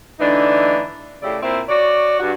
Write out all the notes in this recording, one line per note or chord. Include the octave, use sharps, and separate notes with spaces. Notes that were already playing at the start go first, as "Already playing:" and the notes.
D3 E3 A3 D4 D#4
A2 C#3 E4 G4 D5
A#2 C4 E4 C5 E5
F#4 C#5 D5
G2 F#4